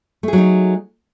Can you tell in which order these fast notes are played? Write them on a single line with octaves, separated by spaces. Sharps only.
A3 G#4 F#3 D#4